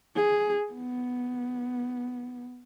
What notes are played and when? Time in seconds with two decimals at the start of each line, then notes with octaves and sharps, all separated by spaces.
0.16 G#4
0.73 B3